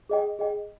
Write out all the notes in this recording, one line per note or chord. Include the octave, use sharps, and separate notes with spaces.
G#4 D#5 G5
G#4 D#5 G5